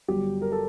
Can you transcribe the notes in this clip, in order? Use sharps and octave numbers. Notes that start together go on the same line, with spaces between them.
G1 G2 F#3 G4
A#4
A4